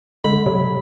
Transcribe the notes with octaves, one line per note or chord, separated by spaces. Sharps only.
D3 G#3 B5
C3 F#3